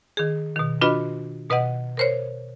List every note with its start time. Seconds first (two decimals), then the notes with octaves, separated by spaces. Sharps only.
0.17 D#3 G#4
0.56 B2 D#3
0.81 D4 F4 F#4 B4 D#5 B5
1.50 B2 B4 D#5 F#5
1.97 A#4 C5 C#5